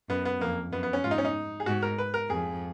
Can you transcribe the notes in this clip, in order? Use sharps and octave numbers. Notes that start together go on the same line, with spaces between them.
F#2 B3
B3
F2 A#3
F#2 B3
B3
C#4
G#2 F4
D#4
C#4
D#4
G#4
G#2 F#4
A#4
B4
A#4
F2 G#4